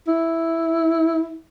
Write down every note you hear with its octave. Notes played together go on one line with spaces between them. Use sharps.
E4